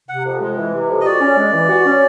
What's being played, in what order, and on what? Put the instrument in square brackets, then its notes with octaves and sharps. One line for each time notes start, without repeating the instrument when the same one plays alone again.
[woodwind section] C3 [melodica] F#5
[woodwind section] F2
G#3
E3
C3
F2
[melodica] D#5
[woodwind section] F#4 [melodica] D5
[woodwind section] C#4
G#3
E3
F#4
C#4